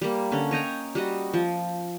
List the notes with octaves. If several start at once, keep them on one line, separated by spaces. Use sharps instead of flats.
G3 A#3
D3 C#4
C#5 D#5 G5 A#5
G3 F#4 D#5
F3